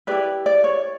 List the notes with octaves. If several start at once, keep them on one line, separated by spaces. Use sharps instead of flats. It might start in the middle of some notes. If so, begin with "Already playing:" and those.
E4 G4 B4 D5
D5
C#5